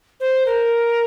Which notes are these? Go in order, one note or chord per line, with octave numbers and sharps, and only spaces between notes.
C5
A#4